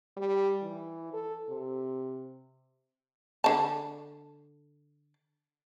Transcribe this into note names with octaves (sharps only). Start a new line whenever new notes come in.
G3
E3
A4
C3
D3 A5